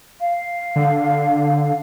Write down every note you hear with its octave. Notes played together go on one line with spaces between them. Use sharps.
F5
D3